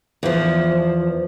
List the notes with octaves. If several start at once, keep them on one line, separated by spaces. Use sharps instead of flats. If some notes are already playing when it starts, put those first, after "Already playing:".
E2 F3